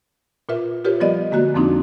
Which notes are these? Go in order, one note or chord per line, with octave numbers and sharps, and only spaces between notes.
A#2 F4 A#4 B4 E5
F4 G4 A#4 B4 C#5
F3 G3 B3 D5 D#5
D3 G#3 A#3 F#4 F#6
F2 F3 A#3 C4 D4 D#4